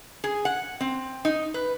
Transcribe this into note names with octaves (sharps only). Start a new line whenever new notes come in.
G#4
F#5
C4
D#4
B4